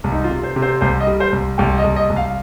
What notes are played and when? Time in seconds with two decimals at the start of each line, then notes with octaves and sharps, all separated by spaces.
0.04 C2
0.12 D#4
0.24 F4
0.30 C3
0.43 C5
0.56 C3
0.62 C5
0.81 C2 C5
1.00 D#5
1.07 G3
1.20 C5
1.32 C2
1.58 C2 G5
1.78 D#5
1.84 C2
1.96 D#5
2.10 C2
2.16 F5